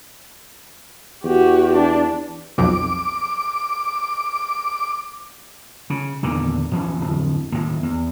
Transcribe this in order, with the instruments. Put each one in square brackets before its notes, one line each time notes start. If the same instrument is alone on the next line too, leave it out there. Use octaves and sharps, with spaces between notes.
[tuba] E2 [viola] F#4 G4
[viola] D4
[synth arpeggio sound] B1 F2 [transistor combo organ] D6
[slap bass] C#3
E2 A#2 D3 D#3
D#2 E3 F3 C#4
D1 F2
D#2 A2
E2